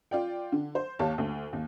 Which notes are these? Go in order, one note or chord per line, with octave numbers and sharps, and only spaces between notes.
F4 D5 G5
D3
C5
D#2 G4 C#5 F5 A5
D2
D#2